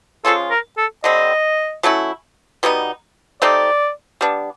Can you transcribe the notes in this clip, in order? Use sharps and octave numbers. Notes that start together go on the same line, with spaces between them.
F3 G#3 C#4 F4 A4
A#4
A4
D3 G3 C4 D#5
F#3 A3 C#4 E4
B2 G3 B3 D#4
A3 C4 D#4 G4 D5
G3 B3 D4